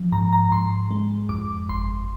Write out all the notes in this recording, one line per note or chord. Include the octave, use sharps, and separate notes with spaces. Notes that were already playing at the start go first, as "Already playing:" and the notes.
Already playing: F3
G#2 A#5
A#5
G#2 C6
G#3
F2 D6
G1 C6